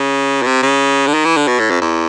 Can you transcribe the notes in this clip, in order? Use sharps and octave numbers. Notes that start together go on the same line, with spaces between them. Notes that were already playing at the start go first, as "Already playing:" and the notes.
Already playing: C#3
B2
C3
C#3
D3
D#3
E3
D3
B2
A2
F2
E2